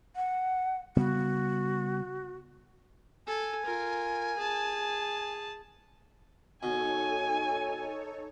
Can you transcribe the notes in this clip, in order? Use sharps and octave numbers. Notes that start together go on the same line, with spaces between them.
F#5
C#3 G3 B3 F#4
A4 G#5
F4 A#4
G#4 A5
B2 D#4 A4 C#5 G#5